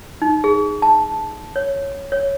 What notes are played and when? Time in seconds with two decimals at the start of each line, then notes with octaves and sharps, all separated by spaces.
0.22 D#4
0.44 G#4
0.82 A5
1.56 C#5
2.12 C#5